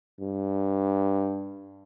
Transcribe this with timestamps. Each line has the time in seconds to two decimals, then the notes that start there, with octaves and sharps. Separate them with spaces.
0.20 G2